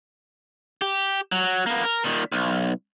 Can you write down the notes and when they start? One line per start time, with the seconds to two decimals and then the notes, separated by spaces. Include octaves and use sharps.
0.82 G4
1.32 F#3
1.66 A#3 B3
1.84 A#4
2.04 A#2 D#3
2.32 B1